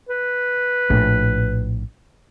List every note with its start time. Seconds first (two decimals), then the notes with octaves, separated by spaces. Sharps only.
0.09 B4
0.90 A#1 A2